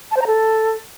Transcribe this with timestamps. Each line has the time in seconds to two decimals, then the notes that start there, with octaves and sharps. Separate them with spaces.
0.11 A5
0.16 C5
0.22 A#5
0.27 A4